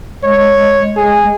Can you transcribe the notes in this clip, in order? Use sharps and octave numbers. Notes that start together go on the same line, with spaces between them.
G#3 C#5
G#4